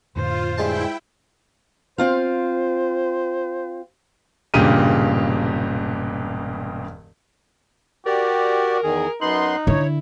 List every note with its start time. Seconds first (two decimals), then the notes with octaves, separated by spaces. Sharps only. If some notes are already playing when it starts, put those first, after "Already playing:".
0.16 F2 A2 D3 F4 C5
0.58 G2 G#3 E4 G5 A5
1.98 C4 F4 C5 F5
4.54 E1 G2 A#2 C#3 G4 D#7
8.06 F#4 G4 A#4 D5
8.84 E2 D#3 G#4
9.21 F#2 B3 D#4 C6 F#6
9.67 D3 E4 C#5